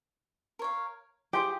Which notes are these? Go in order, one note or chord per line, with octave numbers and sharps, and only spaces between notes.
A#4 C#5 F5
F4 G4 G#4 C5